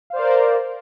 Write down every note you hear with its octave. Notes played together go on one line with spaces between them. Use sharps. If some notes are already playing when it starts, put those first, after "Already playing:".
A#4 C5 D5 F5